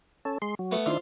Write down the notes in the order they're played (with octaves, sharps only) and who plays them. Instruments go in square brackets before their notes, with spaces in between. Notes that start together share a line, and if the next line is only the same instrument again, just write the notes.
[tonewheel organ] C#4 A4
G#3 C6
F#3
[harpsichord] A3 B3
[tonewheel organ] D#3 D4 E4 [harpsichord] F4 C5